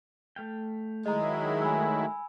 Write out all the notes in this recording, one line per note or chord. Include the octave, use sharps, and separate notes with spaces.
A3 F5 G5
D#3 F#3 G#3 E4 D#5 A#5
A3 G#5 B5 E6